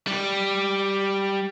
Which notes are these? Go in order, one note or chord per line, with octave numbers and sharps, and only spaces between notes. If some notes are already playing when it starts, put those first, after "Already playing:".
G3